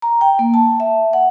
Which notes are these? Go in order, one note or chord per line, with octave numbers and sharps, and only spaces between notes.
A#5
G5
A#3
A5
E5
F#5